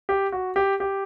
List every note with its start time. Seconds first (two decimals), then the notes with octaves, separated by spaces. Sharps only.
0.09 G4
0.32 F#4
0.56 G4
0.80 G4